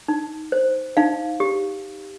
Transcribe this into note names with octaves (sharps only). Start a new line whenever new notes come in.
D#4
C5
D#4 F5
G4